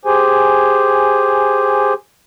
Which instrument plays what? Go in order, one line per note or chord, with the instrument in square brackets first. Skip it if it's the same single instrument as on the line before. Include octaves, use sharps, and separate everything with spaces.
[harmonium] G4 G#4 C5 G#5